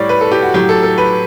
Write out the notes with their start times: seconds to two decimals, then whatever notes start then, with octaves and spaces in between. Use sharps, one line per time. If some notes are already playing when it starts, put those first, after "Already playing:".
Already playing: A2 G3 C#5 D5
0.09 B4
0.21 A4
0.32 G4
0.43 F#4
0.54 A2 F#3 G4
0.69 A4
0.83 A4
0.98 B4